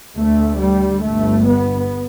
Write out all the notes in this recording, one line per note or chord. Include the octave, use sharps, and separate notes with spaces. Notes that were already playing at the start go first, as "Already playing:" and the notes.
D2 A3
G3
G1 G2 A3
B3